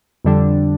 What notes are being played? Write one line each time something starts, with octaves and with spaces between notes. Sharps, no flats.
F2 D3 G3 D4